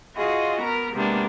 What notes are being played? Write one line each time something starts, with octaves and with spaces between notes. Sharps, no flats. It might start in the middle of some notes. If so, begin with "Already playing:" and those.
F4 F#4 G#4 D#5
B3 A#4 A#5
C3 G#3 A#3 B3 D4